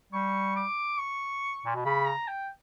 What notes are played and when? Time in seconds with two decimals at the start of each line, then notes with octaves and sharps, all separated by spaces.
0.12 G3 C#6
0.56 D6
0.98 C#6
1.65 A#2
1.75 B2
1.85 C#3 B5
2.07 A#5
2.28 G5